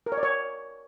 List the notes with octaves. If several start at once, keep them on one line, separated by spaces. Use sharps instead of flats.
A#4
C#5
D5
C#5